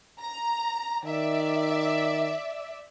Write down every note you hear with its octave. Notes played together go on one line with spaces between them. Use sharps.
A#5
D#3 D5 E5